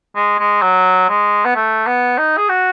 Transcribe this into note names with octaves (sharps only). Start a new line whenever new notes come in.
G#3
G#3
F#3
G#3
B3
A3
B3
D#4
G#4
F#4